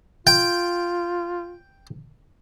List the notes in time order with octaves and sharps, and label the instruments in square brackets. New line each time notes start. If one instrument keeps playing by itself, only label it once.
[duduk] F4 [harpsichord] G5